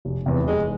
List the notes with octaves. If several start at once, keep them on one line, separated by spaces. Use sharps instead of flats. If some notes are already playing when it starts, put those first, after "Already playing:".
F1
E2 C3
F1 G#3